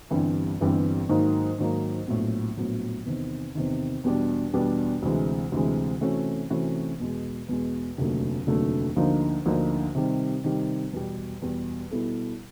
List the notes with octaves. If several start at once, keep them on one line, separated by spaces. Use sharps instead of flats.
G1 G2 E3 G3 C4
G1 G2 E3 G3 C4
G#2 D#3 F#3 A#3 D#4
G#2 D#3 F#3 A#3 D#4
A#1 A2 F#3 B3
A#1 A2 F#3 B3
E2 C3 D#3
E2 C3 D#3
E2 B2 G3 B3 D4
E2 B2 G3 B3 D4
D2 C3 E3 G#3
D2 C3 E3 G#3
C3 E3 A3 C#4 F#4
C3 E3 A3 C#4 F#4
E2 B2 G#3
E2 B2 G#3
F1 D#2 D3 F#3 A3
F1 D#2 D3 F#3 A3
D2 D3 F3 A#3 D#4
D2 D3 F3 A#3 D#4
C3 D#3 G3
C3 D#3 G3
E2 B2 G3
E2 B2 G3
B2 G3 B3 E4 A4